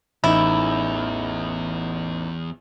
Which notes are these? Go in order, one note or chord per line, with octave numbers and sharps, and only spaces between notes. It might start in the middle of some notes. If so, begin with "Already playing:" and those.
A1 E2 D#4 E4